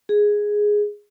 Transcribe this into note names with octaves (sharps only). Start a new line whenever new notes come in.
G#4